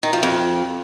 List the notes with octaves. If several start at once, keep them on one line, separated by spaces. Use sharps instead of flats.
D#3
F3
F2